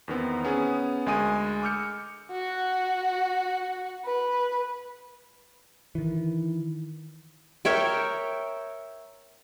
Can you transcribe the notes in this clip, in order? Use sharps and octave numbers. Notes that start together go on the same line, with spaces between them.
E2 D#3 B3 C4
B3 C#4 G#4
D2 G#3 A#4 G#5 D#6 D#7
D6 E6 F6 G6 C#7
F#4
B4
D#3 E3
A#4 C#5 E5 G5